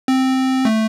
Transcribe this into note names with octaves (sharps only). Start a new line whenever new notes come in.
C4
A3